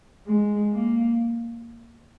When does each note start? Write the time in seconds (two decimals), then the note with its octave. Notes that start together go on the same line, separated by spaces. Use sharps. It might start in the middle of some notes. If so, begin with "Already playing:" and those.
0.28 G#3
0.72 A#3